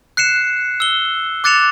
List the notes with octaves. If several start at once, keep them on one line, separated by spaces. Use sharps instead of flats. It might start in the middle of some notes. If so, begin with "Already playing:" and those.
F#6 C7 C#7 E7
E6 G7
D6 F#6 A6 C#7 E7 F7